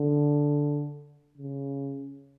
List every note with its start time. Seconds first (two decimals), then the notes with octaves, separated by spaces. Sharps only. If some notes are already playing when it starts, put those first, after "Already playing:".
Already playing: D3
1.38 C#3